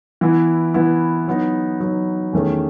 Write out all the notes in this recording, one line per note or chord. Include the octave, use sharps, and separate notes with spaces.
E3 B3 E4
E3 B3 E4
F#3 B3 D#4
F#3 B3 D#4
E2 D#3 A3 C#4